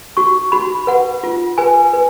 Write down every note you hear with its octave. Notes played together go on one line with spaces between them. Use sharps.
F#4 C#6
F#4 B5
B4 F#5
F4
B4 G#5
B4